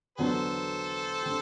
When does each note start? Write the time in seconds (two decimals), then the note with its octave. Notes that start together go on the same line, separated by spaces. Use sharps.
0.18 E2 D3 F#3 B3 A4 C5
1.22 D3 A3 C4 G4